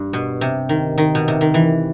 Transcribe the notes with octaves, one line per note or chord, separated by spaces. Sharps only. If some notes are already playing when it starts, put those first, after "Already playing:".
Already playing: G2
B2
C3
D#3
D#3
B2
C3
D#3
E3